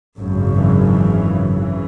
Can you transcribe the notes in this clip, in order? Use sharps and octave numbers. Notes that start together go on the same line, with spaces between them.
G#1 F#2 C#3
E3
E3
C#3 E3